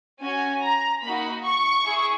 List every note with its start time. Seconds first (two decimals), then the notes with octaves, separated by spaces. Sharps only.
0.21 C#4 F#4 G#5
0.62 A#5
1.03 A#3 D#4 F#4 B5
1.43 C#6
1.85 E4 G#4